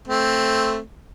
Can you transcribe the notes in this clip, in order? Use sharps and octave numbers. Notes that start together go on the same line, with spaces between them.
A3 C4